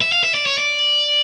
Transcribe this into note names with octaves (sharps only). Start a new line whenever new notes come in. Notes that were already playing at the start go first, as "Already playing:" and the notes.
E5
F5
E5
D5
C#5
D5